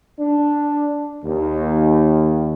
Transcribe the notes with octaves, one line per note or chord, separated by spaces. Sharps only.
D4
D#2